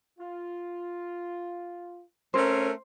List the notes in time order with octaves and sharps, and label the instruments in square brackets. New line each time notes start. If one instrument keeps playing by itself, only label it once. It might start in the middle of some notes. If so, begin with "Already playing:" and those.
[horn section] F4
[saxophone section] A3 C4 C#4 [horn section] A#4 [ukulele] C5